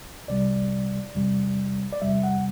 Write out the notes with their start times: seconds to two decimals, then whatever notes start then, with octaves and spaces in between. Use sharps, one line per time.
0.28 C2 C3 G3 D5
1.15 E2 C3 G3
1.93 D5
2.02 E2 C3 G3 E5
2.23 F#5